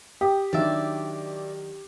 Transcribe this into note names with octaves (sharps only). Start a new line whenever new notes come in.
G4 D#6
D#3 F#3 D4 D5 E5